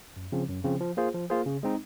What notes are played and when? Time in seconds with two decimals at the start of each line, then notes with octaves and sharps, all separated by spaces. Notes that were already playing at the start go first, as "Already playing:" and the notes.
0.16 F#2
0.32 C#3 F3 C4
0.49 F#2
0.64 C#3 F3 C4
0.81 F3
0.97 A#3 F4 G#4 C5
1.14 F3
1.30 A#3 F4 G#4 C5
1.46 C#3
1.63 G#3 C4 D#4